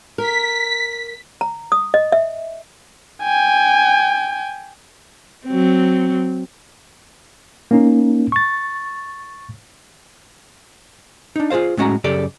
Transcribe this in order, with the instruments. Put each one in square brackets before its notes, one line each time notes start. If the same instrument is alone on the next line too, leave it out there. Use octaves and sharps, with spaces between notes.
[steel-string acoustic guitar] A#4 [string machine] B6
[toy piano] A#5
D#6
D#5
E5
[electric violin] G5 G#5
[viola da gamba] F#3 C4
[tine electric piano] A#3 C#4 D#4
C#6 A6
[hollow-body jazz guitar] D4 D#4
F4 G#4 A#4 C5 F5
A2 G#3 C#4 F#4 F#5 A#5
F#2 C#3 G4 A4 D5